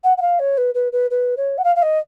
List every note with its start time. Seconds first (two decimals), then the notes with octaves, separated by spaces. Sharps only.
0.04 F#5
0.17 F#5
0.22 F5
0.39 C#5
0.57 B4
0.74 B4
0.92 B4
1.10 B4
1.37 C#5
1.58 F#5
1.64 F5
1.75 F5
1.82 D#5